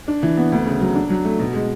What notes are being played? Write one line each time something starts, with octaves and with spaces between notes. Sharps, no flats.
D4
E3
B3
D2
C#3
F#3
D4
F#3
A3
B2
G#3